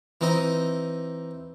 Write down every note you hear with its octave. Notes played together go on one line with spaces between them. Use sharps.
E3 C4 D#4 D#5 D#6